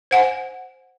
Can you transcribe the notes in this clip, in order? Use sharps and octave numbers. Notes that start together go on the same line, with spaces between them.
C5 F#5 G#5